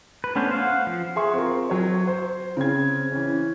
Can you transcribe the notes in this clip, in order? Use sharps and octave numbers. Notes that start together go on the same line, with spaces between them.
B4
A3 B3 C#4 D4 C5
C5 F5 F#5
F3
G#4 E5 C6 C#6
C4 F4 A#4
F#3 C#5
C5
C#3 C4 G#6
E3 C#4